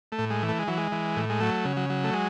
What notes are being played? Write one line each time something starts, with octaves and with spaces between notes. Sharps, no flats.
A3
A2
G#3
E3
A3
G#3
E3 F#3
G#3
E3
A2
G#3
F#3 A3
C#3
F#3
F#3
A3
G#3